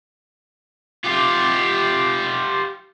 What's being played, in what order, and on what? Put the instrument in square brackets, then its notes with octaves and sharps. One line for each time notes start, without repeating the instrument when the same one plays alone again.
[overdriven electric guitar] F4 G4